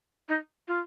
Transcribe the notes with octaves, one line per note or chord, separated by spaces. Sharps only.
D#4
F4